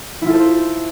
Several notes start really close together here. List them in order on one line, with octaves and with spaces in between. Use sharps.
E4 F4 A4 C5